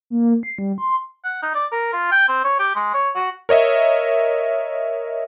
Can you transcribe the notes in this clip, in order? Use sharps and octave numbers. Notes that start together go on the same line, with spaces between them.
A#3
C7
G3
C6
F#5
D#4
D5
A#4
F4
G5
C4
C#5
G4
G#3
C#5
F#4
A#4 C#5 D#5 E5